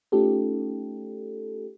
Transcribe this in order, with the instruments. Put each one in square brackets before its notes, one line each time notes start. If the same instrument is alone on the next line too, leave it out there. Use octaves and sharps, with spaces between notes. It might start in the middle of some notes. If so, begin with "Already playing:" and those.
[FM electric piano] A3 C#4 D#4 F4 G4 A4